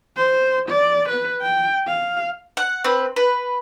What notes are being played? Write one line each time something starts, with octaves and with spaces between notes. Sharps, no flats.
C5
D5
B4
G5
F5
F#5
C4 B4
B4